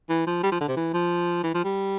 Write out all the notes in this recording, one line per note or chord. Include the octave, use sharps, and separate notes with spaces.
E3
F3
G3
F3
D3
C3
E3
F3
E3
F3
G3